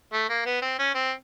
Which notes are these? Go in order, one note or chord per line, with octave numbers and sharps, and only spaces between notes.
A3
A#3
B3
C4
C#4
C4